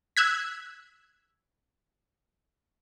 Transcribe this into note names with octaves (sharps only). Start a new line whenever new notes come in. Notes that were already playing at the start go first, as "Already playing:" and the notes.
E6 F#6 G#6 B6